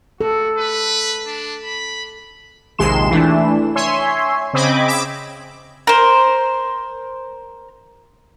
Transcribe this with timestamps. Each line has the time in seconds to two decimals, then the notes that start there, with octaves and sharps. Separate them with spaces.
0.21 F#4 A4
0.58 B4
1.27 D4
1.64 B5
2.78 A#1 D#2 C3 G#3 C6 E7
3.10 E3 A3 D4
3.76 C#5 E5 G#5 C6
4.53 C#3 C4 D#5 B5 D6 G#6
4.88 D6 E6 D7
5.87 A#4 C5